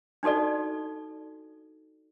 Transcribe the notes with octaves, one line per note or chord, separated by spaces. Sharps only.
D4 D#4 F#4 A4 D5